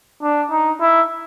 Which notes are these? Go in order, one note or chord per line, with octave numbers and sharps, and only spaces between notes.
D4
D#4
E4